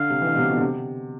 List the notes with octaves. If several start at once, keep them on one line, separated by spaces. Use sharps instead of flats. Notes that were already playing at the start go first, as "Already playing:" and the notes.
Already playing: D3 F5
C3
E3
D3
B2
C3
B2
D3
C3